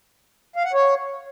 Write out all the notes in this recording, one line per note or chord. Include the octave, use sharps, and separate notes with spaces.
F5
F#5
C#5